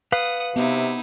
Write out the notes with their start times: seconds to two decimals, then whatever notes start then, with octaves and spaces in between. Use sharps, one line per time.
0.12 B4 F5 F#5 D#6
0.56 C3 B3 D#4 E4